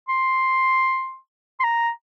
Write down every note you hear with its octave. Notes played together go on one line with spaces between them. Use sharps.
C6
C6
A#5